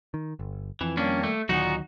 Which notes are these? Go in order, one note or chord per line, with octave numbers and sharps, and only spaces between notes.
D#3
G1
F2 E3
D#3 G3 A#3 C#4 D4
A3
D2 A#2 D#3 F#3 B3 D#4 F#4